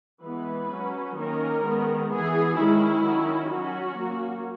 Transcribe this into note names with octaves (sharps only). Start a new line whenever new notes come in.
E3 G#3 B3 B4
F#3 C#4
D#3 A#3 C#4 A#4
D#3 G#3 B3
E3 B3 G#4
D#3 G#3 C#4 E4
D#3 F#3 C#4
F#3 C#4 F#4
F#3 A#3 C#4